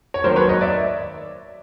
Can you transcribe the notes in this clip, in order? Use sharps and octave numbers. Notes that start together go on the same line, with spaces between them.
C#5
D#2 D#3 F#3 A#4 C5
B4 C#5
C#5 D#5
D5 E5